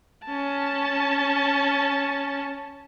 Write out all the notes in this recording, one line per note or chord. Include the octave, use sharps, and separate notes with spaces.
C#4 A5